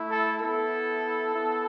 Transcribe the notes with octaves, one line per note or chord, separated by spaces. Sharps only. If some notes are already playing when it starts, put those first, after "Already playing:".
Already playing: A3 E4
A4
B3 E4 A4
B3 E4